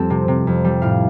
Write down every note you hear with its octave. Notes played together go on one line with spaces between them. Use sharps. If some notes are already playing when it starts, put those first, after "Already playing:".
Already playing: F2 G3 C4 A4
C3
C3
F2
G3
A2 F5